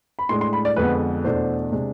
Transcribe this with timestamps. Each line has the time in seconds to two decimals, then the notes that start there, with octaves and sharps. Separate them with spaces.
0.19 B5
0.29 A2 G#3 D4 C6
0.41 C6
0.53 B5
0.65 D5
0.76 F2 D3 G#3 B3 B4
1.24 E2 B2 A3 D4 C5
1.72 C3 G#3 D4